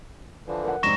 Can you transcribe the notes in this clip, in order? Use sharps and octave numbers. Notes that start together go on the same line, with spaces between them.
D3 E3 F3
A#4 F#5
F1 G#2 G3 C4 D#4 C#6 A#6 E7